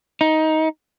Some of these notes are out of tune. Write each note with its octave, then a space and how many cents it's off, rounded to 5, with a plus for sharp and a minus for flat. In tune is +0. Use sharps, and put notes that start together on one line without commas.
D#4 +15